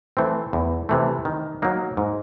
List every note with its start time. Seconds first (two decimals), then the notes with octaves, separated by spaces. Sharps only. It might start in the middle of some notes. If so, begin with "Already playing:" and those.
0.17 E3 A3 C4
0.53 E2
0.89 C3 E3 A3
1.25 D#3
1.62 F#3 A#3 D#4
1.97 G#2